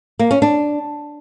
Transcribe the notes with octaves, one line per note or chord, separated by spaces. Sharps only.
A#3
C#4
D4